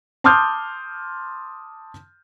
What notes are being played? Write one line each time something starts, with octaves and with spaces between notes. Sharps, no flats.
A5 C6 D6 D#6 F6 G6